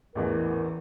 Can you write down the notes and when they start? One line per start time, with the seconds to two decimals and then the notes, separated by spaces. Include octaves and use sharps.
0.15 A1 E2 E3 A#4